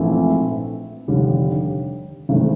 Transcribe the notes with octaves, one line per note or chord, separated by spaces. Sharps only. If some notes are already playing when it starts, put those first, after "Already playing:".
Already playing: A#1 G#2 E3 A3 C4
F1 D#2 D3 G3
G#1 G2 E3 A3